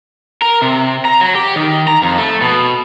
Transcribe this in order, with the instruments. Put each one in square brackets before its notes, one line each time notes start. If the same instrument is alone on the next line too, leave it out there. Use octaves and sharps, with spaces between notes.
[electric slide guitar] A#4
C3
A#5
F#3
G4
D#3
A#5
F2
A3
B2